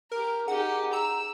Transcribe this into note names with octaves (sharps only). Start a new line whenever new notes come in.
G4 A#4 A#5
D#4 G4 G#4 F#5
A#5 E6